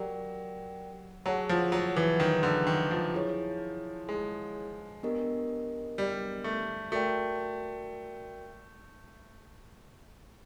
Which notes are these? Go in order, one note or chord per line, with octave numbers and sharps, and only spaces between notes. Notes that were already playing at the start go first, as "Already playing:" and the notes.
Already playing: F#3 G4 A#4 D5 G5
F#3 G#4 C#5 F#5 A5
F3
F#3
E3
D#3
D3
D#3
F3
E4 G#4 C#5
G#3
B3 D4 G4 A#4 D#5
G3
A3
A3 F#4 A#4 D5 G5